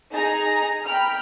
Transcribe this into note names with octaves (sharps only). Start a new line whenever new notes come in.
D#4 G#4 G#5 A#5
G5 B5 F6